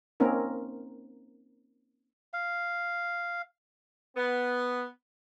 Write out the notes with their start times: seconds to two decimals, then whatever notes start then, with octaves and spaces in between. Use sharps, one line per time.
0.20 A#3 C4 C#4 D#4 A#4
2.33 F5
4.16 B3